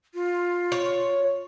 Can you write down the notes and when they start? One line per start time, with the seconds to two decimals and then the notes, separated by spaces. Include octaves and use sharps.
0.14 F4
0.72 C#5